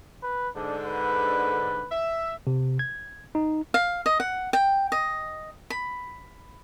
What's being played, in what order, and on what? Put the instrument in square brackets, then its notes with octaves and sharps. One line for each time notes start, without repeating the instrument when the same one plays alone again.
[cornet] B4
[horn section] G#2 D3 [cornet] D4
[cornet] B4
[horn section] E5
[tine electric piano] C3
G#6
D#4
[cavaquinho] F5
D#5
F#5
G5
D#5
B5